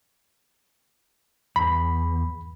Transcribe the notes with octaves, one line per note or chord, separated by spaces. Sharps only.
E2 B5